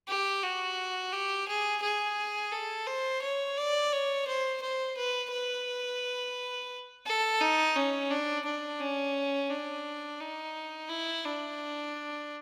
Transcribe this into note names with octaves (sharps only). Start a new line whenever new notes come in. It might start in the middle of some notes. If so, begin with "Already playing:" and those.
G4
F#4
G4
G#4
G#4
A4
C5
C#5
D5
C#5
C5
C5
B4
B4
A4
D#4
C#4
D4
D4
C#4
D4
D#4
E4
D4